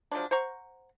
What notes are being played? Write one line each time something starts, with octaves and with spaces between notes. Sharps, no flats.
F3 F#3 G#3 D4
C5 F#5 A#5 C#6